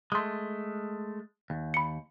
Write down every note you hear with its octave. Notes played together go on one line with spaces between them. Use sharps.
G#3 A3 C6 D#6
D#2
B5 C#7